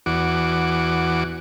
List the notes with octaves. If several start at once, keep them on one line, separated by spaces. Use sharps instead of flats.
E2 F#4 D6